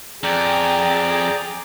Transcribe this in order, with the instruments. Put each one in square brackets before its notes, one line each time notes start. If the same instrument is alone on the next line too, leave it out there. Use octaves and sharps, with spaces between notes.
[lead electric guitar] F2 [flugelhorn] G#4 [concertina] D5 G5 A#5